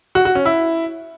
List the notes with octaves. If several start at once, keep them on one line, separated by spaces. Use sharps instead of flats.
F#4
F#4
C#4
E4